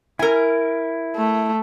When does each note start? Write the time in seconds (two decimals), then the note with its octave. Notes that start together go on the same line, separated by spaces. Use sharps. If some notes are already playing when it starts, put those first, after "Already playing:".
0.19 E4 A#4 G#5
1.16 A3